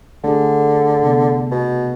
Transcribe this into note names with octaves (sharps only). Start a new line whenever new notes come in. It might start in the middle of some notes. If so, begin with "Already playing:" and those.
D3 A3 D4 G#4
C3 B3
B2